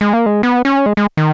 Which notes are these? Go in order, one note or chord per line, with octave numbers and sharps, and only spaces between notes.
G#3
A#3
G#3
B3
C#4
G#3
G#3
D#3